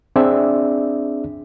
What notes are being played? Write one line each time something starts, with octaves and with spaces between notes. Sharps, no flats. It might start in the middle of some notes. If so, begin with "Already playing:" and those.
C4 D4 G#4 D5 E5